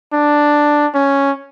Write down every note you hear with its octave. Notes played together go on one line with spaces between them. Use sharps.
D4
C#4